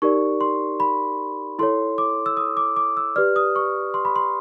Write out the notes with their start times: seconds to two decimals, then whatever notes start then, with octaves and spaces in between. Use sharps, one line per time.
0.02 D#4 G4 A#4 D5 C#6
0.41 C6
0.80 B5
1.59 E4 A4 C#5 C6
1.98 D6
2.26 E6
2.37 D#6
2.57 D6
2.76 D6
2.97 E6
3.16 G4 B4 D5 F6
3.36 D#6
3.56 C#6
3.94 C6
4.05 B5
4.16 C6